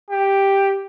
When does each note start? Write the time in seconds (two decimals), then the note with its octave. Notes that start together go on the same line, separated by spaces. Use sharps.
0.11 G4